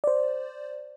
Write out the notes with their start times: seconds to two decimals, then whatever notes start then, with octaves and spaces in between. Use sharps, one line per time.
0.04 C5 D5